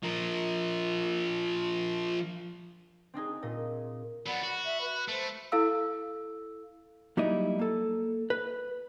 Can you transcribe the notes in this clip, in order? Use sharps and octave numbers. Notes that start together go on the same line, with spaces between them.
F3 A#4
C4 D4 D#4 G#4
A#2 D#5
F#3 B3 D5 F#5 B5
F#4
E5
B4 B5
A3 C5
E4 A4 F5 E6
F#3 G3 A#3 D#4 E4 D#5
A#3 A4
B4